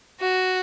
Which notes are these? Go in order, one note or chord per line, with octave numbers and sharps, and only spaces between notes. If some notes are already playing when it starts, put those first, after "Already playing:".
F#4